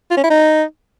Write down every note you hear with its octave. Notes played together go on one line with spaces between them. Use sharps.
F4
C#4
E4
D#4